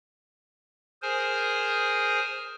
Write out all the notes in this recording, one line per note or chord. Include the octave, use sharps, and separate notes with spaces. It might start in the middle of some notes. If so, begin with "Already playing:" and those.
G#4 A#4 C5 G#5